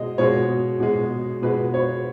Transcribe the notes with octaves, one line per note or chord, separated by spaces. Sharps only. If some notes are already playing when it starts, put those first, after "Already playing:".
Already playing: B2 G#3 D#5
B2 G#3 C#5
B2 G#3
B2 G#3 B4
C#5